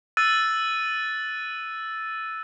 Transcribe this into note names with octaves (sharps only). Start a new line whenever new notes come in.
E6 F#6 A6 D#7